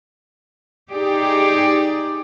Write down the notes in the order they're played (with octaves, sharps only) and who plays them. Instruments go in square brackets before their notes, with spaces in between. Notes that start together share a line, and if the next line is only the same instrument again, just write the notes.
[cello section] D#4 G4 G#4 D5